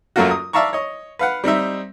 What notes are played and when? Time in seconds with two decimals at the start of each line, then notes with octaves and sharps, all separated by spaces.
0.16 F#2 F#3 A3 A#3 F4 F#4
0.31 D#6
0.53 D5 E5 F5 A5 A#5 C#6
0.73 C#5 D#5
1.19 B4 F5 F#5
1.44 G3 C4 D#4 E5